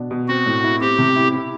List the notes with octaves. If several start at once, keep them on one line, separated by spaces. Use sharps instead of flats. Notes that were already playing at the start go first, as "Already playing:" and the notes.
Already playing: B2 D4
B2
C4 F#4
A2
E4
C4 G4
C3
E4
E4